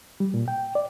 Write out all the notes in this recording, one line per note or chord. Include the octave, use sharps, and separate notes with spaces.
G3
A#2
G5
D5